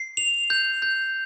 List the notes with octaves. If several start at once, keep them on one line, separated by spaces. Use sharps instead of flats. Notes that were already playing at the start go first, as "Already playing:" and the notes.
Already playing: C7
F7
G6
G6